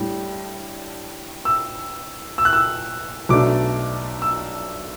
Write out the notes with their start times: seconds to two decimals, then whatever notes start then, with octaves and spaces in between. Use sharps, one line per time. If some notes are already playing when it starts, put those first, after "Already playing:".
Already playing: A2 G3 D4
1.45 E6
2.38 E6
2.45 F#6
2.53 E6
3.29 B1 B2 A3 D4 D6
4.22 E6